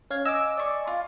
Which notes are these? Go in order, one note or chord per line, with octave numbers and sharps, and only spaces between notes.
C#4 F5 G#6
D#5 G#5 D6 E6
D5 C#6
F4